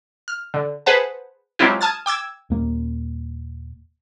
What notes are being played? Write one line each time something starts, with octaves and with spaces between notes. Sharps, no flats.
F6
D3
G#4 B4 C5 F#5 A5
F#3 G#3 C4 E4 F4 G4
A5 D#6 F6 G#6 A6
G5 D6 E6 G#6
D#1 A#3